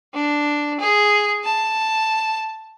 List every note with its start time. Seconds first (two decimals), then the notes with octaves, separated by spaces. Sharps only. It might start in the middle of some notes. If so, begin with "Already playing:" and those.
0.14 D4
0.80 G#4
1.44 A5